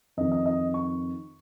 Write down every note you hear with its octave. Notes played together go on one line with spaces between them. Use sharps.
F2 D#3 D#5
D#5
D#5
C#6